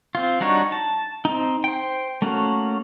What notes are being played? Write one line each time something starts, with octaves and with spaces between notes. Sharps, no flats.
C4 F4
G3 D4 D#4 F#4 C#5
A5
C4 D#4
C5 G5
A3 A#3 C#4 F#4